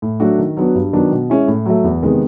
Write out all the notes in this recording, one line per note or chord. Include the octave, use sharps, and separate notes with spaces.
A2
F#3 A3 D4 F#4
D#3
F#3 B3 D4 F#4
G2
D#3 F#3 B3 D4
B2
G#3 C#4 E4
A2
F#3 A3
E2
C3 D#3 G#3 B3